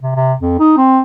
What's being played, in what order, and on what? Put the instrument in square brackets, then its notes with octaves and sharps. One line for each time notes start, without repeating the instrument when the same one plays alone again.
[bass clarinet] C3
C3
F2
D#4
C4